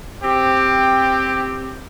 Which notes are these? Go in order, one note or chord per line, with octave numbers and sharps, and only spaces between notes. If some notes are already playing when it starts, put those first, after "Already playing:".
C4 G4